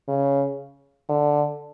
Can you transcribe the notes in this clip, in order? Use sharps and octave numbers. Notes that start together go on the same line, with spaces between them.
C#3
D3